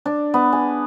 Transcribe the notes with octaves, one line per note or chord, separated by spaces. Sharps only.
D4
B3
G#5